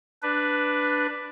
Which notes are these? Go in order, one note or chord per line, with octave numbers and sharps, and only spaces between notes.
D4 B4